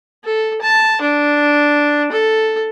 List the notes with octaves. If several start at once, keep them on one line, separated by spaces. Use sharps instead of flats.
A4
A5
D4
A4